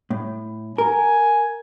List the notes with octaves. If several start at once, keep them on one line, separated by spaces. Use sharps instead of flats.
A2
A#4 G#5